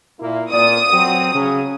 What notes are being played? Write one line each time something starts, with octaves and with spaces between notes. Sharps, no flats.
A#2 A#3 E4
A#2 D5 D#6
F#3 C4 F#4
C#3 F#3 C#4